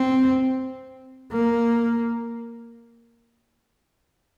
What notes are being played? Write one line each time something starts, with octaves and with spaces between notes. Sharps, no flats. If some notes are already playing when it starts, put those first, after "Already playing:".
Already playing: C4
A#3